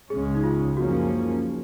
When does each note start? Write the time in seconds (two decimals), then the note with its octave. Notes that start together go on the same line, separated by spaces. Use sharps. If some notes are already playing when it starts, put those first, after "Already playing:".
0.10 C#2 C#3 G#3 C#4 G#4
0.35 D#4
0.43 F4
0.77 F#2 F3 A#3 C#4 F#4